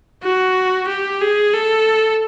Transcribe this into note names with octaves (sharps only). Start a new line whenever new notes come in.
F#4
G4
G#4
A4